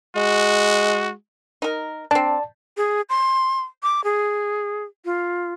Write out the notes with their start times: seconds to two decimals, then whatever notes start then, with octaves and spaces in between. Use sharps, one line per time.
0.16 G#3 F#4
1.62 D#4 A#4
2.11 C4 D4 D5 A5
2.77 G#4
3.09 C6
3.83 D6
4.04 G#4
5.05 F4